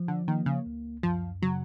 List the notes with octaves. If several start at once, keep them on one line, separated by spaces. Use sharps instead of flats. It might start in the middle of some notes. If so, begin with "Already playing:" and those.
Already playing: F3
D3
D#3 A#3
C#3
C#2
F#2 F3
C#3 F#3